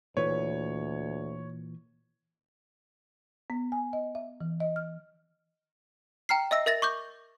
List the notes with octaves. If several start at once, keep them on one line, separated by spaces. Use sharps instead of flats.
D2 A#2 E3 B4 C#5 E5
B3
G#5
D#5
E5
E3
D#5
F6
G5 A#5 F6 C7
D#5 E5 E6 A#6
A#4 E5 A6 A#6
C#6 D6 G6